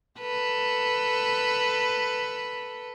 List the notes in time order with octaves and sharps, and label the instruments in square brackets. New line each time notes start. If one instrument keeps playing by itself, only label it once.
[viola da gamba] A4 B4